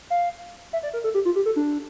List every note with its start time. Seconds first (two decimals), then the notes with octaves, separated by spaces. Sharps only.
0.10 F5
0.73 E5
0.83 D5
0.93 A#4
1.04 A4
1.14 G4
1.25 F4
1.36 G4
1.46 A4
1.56 D4